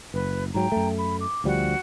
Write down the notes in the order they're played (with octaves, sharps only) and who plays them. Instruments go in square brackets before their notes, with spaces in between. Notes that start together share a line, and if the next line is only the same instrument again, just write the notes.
[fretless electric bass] F#1 [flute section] B4
[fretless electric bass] G#2 F#3 [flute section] G5 A#5
[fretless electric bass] F#2 A3
[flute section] B5
D6
[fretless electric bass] D2 F3 G3 [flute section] F#4